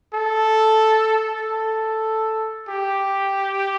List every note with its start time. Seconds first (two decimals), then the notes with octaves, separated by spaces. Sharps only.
0.14 A4
1.40 A4
2.68 G4